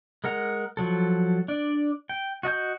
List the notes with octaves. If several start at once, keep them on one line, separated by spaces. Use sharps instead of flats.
G#3 A#4 F#5 A#5
F3 F#3 A4
D4 D5
G5
F#4 D#5 G#5 G6